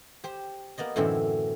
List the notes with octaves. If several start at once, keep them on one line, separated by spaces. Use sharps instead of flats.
G4 C5
A#3 B3 D5 D#5
F#2 A2 D3 E3 C4 E4